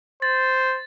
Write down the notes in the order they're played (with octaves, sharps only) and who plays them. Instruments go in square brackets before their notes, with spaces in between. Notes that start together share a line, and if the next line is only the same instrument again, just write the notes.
[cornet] C5 [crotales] A6